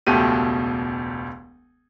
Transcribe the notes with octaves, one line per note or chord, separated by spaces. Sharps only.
E1 C#2 B2 A3 G4 D#7